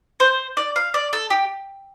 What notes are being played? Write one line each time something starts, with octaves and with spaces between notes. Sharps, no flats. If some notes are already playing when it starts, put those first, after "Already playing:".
C5
D5
F5
D5
A4
G4